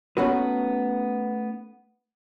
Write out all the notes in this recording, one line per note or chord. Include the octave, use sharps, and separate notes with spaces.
A3 B3 C#4 D#4 F#4 B4